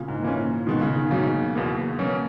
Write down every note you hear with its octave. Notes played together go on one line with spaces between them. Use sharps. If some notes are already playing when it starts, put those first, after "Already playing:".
Already playing: A#2 C#3
G#2
A#2 E3 A#3 C#4
B2 D#3 G#3 B3
C#3
D#3
G#2 C#3 F#3 A#3 D#4
E2 B2 A#3
B2 F#3 A#3 C#4